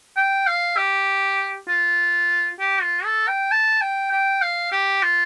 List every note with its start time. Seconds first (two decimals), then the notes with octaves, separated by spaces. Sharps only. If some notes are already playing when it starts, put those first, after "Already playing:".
0.16 G5
0.47 F5
0.77 G4
1.68 F4
2.59 G4
2.82 F4
3.05 A4
3.28 G5
3.52 A5
3.81 G5
4.11 G5
4.42 F5
4.72 G4
5.03 F4